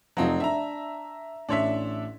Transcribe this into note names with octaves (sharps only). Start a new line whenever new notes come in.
F1 F3 F#3 C4 D#4
D4 E5 A#5
A1 D4 C#5 E5 C6 B6